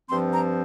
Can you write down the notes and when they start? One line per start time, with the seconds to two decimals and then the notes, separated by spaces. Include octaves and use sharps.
0.09 G2 F3 C4 C6
0.33 A#5